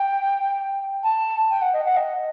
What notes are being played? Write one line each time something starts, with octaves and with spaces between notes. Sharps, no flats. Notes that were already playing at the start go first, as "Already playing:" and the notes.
Already playing: G5
A5
G5
F#5
D#5
F#5
D#5